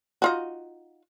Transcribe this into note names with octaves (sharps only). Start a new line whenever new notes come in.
D#4 F4 F#4